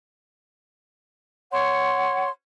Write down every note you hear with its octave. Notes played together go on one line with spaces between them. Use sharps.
C#5 F#5 C6